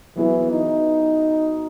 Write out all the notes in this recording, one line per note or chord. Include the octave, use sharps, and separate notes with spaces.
E3 F#3 B3 E4 G#4
D#4